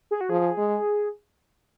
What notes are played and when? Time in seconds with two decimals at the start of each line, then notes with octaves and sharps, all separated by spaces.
0.11 G#4
0.21 F#4
0.30 F3 G#4
0.57 G#3